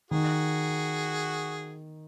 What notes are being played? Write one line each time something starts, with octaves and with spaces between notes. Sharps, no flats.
D#3 F#4 G#4